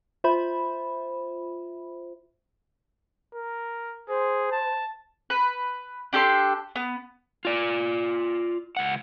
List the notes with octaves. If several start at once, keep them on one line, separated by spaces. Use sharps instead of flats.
F4 C5 E5 B5
A#4
G#4 C5
A5
B4
D4 G4 A4 C6
B3
F4 D5
C#2 F#5